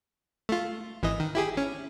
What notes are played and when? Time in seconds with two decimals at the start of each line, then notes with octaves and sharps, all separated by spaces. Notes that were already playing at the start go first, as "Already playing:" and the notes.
0.49 A3 F4
1.03 G#1 E3 D#5
1.20 D#3
1.35 E4 G4 G#4
1.57 C#4